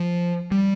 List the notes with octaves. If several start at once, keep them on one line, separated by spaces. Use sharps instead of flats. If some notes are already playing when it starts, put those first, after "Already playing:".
Already playing: F3
G3